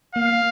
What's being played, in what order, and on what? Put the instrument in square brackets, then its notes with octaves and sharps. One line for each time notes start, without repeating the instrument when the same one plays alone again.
[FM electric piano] A#3 [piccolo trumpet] F5